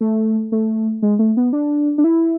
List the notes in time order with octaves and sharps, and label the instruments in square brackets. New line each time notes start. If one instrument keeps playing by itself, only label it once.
[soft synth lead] A3
A3
G#3
A3
B3
D4
D4
E4